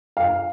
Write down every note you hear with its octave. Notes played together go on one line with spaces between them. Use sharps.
F5